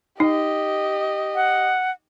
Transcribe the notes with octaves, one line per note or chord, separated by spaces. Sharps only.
D#4 G4 D#5
F#5